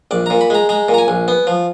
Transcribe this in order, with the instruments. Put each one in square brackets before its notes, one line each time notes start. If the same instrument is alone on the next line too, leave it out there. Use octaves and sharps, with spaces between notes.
[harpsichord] A#1 D5
A#2 A#5
B5
G#3 A#5
G#3 A#5
A#2
A#5
G#5
A#1
B3
F3